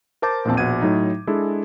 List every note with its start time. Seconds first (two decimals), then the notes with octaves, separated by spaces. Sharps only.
0.22 A#4 C5 A5 D6 G6 A6
0.45 A#1 E2 A#2 C4 A5
0.57 A#1 B2 F#5 G#6 D#7
0.82 A2 F#3 D#4
1.27 G#3 D4 E4 G#4 A4